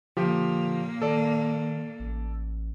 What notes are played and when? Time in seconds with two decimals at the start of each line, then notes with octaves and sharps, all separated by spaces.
0.17 A#2 D3 F3 A#3 G4
1.02 D#3 A4 D5
1.99 A1